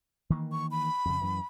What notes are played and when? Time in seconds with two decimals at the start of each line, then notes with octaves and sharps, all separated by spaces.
0.30 D#3 E3 A#3
0.52 C#6
0.71 B5
1.05 F2 C#3
1.22 F#2 E3